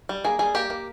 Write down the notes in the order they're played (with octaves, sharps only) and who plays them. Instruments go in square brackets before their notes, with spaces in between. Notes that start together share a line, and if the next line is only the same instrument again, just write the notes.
[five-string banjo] G3
A#3 G#4
G3 G#4
A#3 G4
A#3